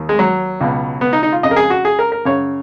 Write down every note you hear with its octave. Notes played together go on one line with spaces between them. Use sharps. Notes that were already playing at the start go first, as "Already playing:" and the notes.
Already playing: D#2 D#3
G#3
F#3
C#2 B2
B3
D#4
D#4
F4
F2 C#3 D#5
A#4
G#4
F#4
G#4
A#4
A#4
F#2 C#3 C#5